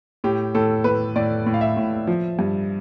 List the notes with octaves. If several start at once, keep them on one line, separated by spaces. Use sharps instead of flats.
A2 G4
A2 A4
A2 B4
A2 D5
A2
F5
E5
A2
F3
G2